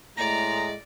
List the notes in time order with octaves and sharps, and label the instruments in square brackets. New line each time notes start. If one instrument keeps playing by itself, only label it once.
[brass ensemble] A2 G#3 [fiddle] D5 [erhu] A#5 [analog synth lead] A#6